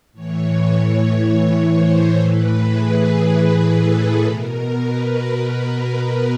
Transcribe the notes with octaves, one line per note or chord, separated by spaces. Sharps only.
A2 E3 C#5
C5
A2 E3 B4
G#4
G#4
A4
B2 A#4
B4
A#4
B4